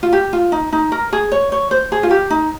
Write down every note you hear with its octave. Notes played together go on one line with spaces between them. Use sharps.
F4
G4
F4
D#4
D#4
A#4
G#4
C#5
C#5
C5
G#4
F4
G4
D#4